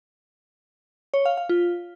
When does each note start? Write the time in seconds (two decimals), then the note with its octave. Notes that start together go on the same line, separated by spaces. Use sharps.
1.14 C#5
1.25 F5
1.37 F5
1.49 F4